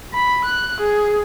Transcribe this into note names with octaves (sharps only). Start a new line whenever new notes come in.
B5
F#6
G#4